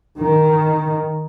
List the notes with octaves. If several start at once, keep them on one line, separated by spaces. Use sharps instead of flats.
D#3